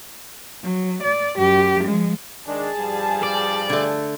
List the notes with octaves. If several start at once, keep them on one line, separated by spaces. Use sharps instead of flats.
F#3
D5
F#2 G4
F3 G#3
D#3 G#3 D4 G#4 A5
G2 F3 G3
D5
D3 A3